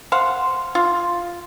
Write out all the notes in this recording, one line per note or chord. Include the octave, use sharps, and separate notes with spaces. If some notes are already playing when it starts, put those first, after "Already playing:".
C5 F5 F#5
F4